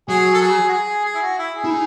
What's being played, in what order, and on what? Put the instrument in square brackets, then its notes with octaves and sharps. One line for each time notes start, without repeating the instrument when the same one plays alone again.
[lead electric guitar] F#3 [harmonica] G#4
[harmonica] A4
G#4
F#4
G#4
G#4
E4
F#4
E4
G#4
[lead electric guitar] E4
D#4